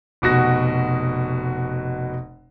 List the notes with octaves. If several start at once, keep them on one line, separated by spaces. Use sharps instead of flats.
F1 B2 F#4 A#6